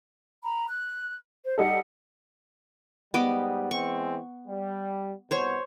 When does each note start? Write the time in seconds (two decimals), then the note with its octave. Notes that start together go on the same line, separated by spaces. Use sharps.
0.44 A#5 B5
0.69 F#6
1.44 C5
1.58 G3 D#4 A4 F#5
3.14 G#2 G3 B3 D#5 D6
3.71 E3 G#3 C4 C#6
4.47 G3
5.31 C2 B2 C5 C#5 C#6